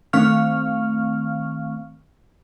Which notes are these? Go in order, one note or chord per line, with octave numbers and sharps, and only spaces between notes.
D#3 A3 C4 F5 C#6 F6